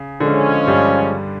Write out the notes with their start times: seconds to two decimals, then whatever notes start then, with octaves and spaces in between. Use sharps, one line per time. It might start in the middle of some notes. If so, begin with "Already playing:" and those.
Already playing: C#3
0.20 D3 F3 G#3 C#4
0.67 G2 G3